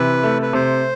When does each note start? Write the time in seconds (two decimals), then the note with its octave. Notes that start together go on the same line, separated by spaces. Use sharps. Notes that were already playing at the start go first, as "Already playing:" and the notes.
Already playing: C3 E3 B4
0.23 A3
0.42 B4
0.53 C3 C5